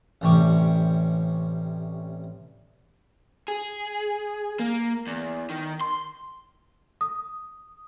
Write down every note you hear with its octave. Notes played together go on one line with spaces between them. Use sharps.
A1 C3 G3 G5 C#6 D6
G#4
A#3
E2
D#3
C6
D#6